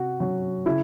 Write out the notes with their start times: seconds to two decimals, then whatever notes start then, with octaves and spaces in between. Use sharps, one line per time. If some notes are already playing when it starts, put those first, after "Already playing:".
Already playing: C3 F#4
0.20 F#3 C#4 F#4
0.66 C#3 E4